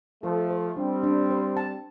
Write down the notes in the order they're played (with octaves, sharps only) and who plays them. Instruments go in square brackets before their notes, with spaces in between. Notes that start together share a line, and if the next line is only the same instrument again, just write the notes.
[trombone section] F3 A3 [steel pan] A4
[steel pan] C5
[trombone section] G3 C4 [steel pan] D4
[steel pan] D4
C5
A5